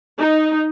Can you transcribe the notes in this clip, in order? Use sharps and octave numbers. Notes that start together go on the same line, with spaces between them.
D#4